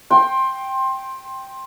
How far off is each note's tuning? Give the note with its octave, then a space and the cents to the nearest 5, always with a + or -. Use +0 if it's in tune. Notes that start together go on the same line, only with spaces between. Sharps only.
G5 +0 C6 +20